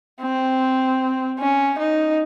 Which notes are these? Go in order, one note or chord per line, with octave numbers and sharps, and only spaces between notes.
C4
C#4
D#4